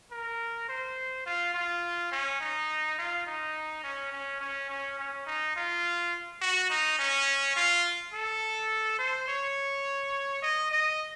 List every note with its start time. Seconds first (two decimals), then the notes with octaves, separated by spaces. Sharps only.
0.12 A#4
0.69 C5
1.26 F4
1.54 F4
2.12 C#4
2.41 D#4
2.98 F4
3.27 D#4
3.84 C#4
4.12 C#4
4.41 C#4
4.70 C#4
4.99 C#4
5.27 D#4
5.56 F4
6.41 F#4
6.70 D#4
6.99 C#4
7.56 F4
8.13 A4
8.99 C5
9.28 C#5
10.43 D#5
10.71 D#5